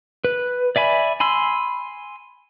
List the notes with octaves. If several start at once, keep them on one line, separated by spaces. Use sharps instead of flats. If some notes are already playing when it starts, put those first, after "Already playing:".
B4
D5 E5 G#5 B5
G#5 B5 C6 E6